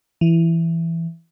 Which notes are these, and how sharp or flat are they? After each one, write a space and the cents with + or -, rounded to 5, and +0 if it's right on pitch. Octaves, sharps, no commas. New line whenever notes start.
E3 +10